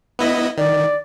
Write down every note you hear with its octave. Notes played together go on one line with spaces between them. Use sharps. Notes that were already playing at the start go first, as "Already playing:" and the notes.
B3 E4 D#5
D#3 D5